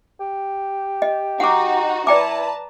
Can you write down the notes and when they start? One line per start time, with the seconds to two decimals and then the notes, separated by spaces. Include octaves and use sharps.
0.20 G4
1.02 D#5
1.40 D#4 F#4 F#5 D6
2.07 E4 B4 D5 G5 A5 A#5 D6